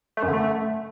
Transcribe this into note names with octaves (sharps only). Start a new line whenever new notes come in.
A3
F#2
D3
A3